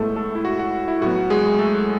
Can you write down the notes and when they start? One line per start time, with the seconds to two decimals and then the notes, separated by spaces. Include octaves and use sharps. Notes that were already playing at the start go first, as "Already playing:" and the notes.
Already playing: A2 G#3 A3 B3 A4
0.16 A3 A4
0.35 E4
0.45 F#4
0.59 F#4
0.88 E4
1.01 A2 F#3 B3 F#4
1.30 G#3 G#4
1.59 A3 A4